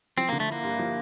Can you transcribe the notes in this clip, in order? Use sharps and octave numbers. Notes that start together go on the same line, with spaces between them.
F3 C4
D3 A#3
A3
A#3 E4
G2
F3